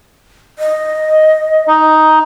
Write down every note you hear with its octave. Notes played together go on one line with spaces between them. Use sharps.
D#5
D#4